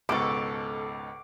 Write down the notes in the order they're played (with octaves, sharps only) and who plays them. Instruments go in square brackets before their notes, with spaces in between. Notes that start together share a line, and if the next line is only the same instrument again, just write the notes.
[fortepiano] C#2 G#2 B2 [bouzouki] A4 [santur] C#6 D6